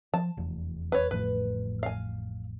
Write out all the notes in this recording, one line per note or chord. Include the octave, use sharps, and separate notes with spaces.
F3 A5
F1 E2
B4 C#5
A1 F2 A2 B4
F5 G#5